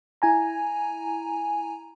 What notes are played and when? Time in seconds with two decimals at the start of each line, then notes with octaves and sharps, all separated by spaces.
0.22 E4 G#5 A#5